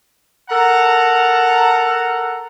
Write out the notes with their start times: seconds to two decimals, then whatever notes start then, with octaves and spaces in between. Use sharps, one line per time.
0.50 A4 A#4 F#5 A5 A#5